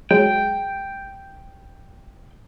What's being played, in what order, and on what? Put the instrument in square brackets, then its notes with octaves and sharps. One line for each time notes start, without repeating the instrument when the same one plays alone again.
[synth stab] F#3 G#3 [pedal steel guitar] G5